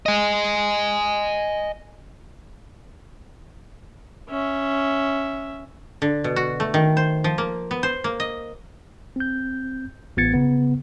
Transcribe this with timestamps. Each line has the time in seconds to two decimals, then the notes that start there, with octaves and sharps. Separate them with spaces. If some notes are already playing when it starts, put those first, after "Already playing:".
0.06 D#5 G#5
4.29 C#4 E5
6.02 D3
6.24 B2
6.36 F#4
6.60 A3
6.74 D#3
6.97 C5
7.24 F3
7.38 A#3
7.71 B3
7.83 C5
8.04 A#3
8.20 D#5
9.16 C4 G6
10.17 A1 B3 F4 G#6 A6 C#7
10.33 C#3 B3